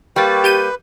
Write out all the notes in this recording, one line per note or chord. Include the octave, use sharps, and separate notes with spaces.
G3 A#3 B4 G5 C#6 A6
G4 G6 D#7